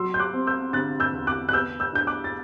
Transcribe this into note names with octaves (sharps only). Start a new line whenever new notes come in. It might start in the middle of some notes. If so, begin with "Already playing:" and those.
Already playing: F#3 C6 E6
G6
D6 F#6
C4
E6 G6
D3 F#6 A6
E6 G6
E2
D6 F#6
F#6
B3 E6 G6
E6 G6
D4 G6
D6 F#6
A6